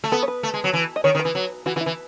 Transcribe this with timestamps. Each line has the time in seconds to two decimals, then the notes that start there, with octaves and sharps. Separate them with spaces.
0.04 A3
0.12 B3 A4
0.23 C#5
0.28 B4
0.43 A3
0.54 G#3
0.64 F#3
0.73 E3
0.96 D#5
1.04 D#3 C#5
1.15 D#3
1.19 B4
1.25 E3
1.35 F#3
1.66 E3 F#4
1.76 E3 F#4
1.81 E4
1.86 E3